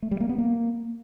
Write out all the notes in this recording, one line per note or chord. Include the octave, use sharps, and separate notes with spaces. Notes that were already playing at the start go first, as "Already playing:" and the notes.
A3
G3
A#3
B3
A#3